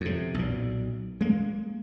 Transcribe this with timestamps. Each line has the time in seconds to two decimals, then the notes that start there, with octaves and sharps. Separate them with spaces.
0.01 F2 C3
0.34 B1 A#2
1.21 G#3 A#3